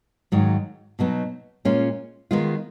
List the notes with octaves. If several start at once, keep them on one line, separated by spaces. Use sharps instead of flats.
G#2 D#3 F#3
B2 F#3 B3 D#4
A#2 G#3 C#4 F4
D#3 G#3 B3 F4